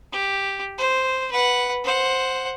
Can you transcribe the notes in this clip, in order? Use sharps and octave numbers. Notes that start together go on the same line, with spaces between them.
G4
C5
B4 F#5
C5 F#5